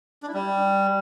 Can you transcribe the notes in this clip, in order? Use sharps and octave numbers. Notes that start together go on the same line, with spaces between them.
D4
E4
G3